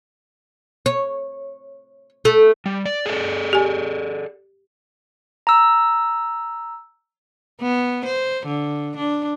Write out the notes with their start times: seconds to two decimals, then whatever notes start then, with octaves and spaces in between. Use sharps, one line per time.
0.86 C#5
2.25 A3
2.66 G3
2.86 D5
3.06 G#4 A4 D5
3.53 G4 G#5
5.47 A#5 E6
7.61 B3
8.05 C5
8.47 D3
8.97 D4